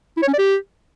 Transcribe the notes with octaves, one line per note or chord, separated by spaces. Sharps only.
E4
C#5
C#4
D5
G4